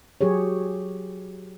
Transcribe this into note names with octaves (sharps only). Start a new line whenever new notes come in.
F#3 G4 G#4 C#5